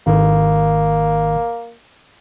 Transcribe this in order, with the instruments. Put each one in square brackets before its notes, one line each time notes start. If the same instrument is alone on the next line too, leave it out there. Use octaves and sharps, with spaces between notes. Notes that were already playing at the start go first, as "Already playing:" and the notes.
[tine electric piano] G#1 D#3 [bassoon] A#3